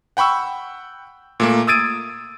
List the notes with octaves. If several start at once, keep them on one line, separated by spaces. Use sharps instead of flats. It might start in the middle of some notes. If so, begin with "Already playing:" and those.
F#5 G5 B5 C#6 E6
A#2 A3 A#3
D#6 E6 G#6 A6 D7 D#7